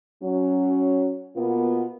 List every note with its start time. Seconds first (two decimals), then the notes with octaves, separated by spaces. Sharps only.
0.22 F#3 C#4
1.36 B2 A#3 B3 F4